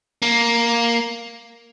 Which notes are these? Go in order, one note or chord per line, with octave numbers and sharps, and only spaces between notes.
A#3